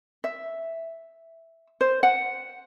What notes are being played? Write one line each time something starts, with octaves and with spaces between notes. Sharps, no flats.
E5
C5
F#5